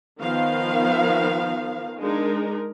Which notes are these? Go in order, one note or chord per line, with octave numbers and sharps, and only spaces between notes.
D#3 F3 B3 F5
G#3 D4 D#4 A#4